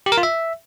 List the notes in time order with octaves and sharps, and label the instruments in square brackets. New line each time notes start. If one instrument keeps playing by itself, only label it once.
[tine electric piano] G4
A#4
F4
E5